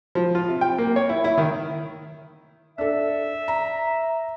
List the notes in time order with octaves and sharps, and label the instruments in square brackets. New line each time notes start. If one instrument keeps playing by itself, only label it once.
[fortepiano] F3
F4
C3
G5
A#3
C#5
E4
E4
D#3
[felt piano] D4 A4 [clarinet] E5
[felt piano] A#5